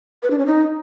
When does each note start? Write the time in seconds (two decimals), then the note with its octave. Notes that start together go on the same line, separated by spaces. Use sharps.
0.22 B4
0.30 D4
0.38 C#4
0.46 D#4